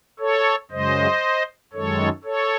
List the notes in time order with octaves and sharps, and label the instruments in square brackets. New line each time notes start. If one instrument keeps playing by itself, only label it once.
[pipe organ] A4 C#5
F#2 C#3 G#3 C5 D#5
F#2 D#3 G#3 A4 C#5
A4 C#5